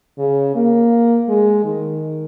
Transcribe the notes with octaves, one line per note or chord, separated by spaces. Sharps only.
C#3
A#3
G#3
D#3